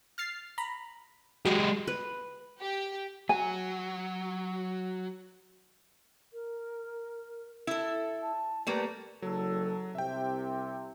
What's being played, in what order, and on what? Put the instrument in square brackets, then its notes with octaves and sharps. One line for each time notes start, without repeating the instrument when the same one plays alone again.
[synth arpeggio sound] F6 A6 C7
A#5 B5
[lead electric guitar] G#3 G4 [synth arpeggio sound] F#4 D#5
[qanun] B4
[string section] G4
[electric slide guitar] F#3 F#4 [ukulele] G#5
[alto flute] A#4
[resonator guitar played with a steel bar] E4 A4
[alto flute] A5
[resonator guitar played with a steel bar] G3 A3 A#3 [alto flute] B4
[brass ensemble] F#1 A4 [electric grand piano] F#3
[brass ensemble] C2 C3 [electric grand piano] E5 G5